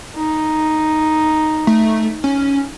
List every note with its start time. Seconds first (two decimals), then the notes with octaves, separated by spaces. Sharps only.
0.16 D#4
1.67 A3
2.24 C#4